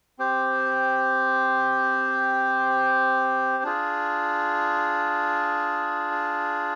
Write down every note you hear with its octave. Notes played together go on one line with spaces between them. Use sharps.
C4 G4 C5
D4 F4 G#4